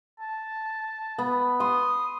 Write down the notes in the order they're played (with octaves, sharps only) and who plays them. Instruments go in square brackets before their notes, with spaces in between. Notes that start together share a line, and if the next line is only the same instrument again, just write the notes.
[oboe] A5
[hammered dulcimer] B3
[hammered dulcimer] C6 [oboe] D#6